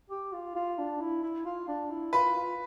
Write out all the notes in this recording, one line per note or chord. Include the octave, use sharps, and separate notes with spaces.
G4
F4
F4
D4
E4
E4
F4
D4
E4
F4 B4
F4